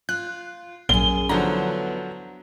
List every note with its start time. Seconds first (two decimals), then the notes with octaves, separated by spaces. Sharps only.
0.09 F4 F#6
0.89 A#1 F#2 G#4 G7
1.29 D3 F3 F#3 B3 E4 A#5